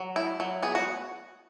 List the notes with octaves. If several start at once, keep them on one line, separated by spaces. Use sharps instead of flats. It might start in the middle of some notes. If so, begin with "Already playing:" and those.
Already playing: F#3
E4
F#3
B3 G#4
F#4